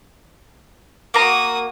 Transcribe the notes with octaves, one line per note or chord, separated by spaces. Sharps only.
A#3 F#4 A#5 D#6